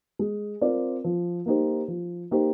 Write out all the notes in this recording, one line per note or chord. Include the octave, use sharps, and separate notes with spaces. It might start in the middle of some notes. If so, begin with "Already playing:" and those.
G#3
C4 F4 A#4 D5
F3
A#3 D#4 G4 C5
F3
A#3 D#4 G4 C5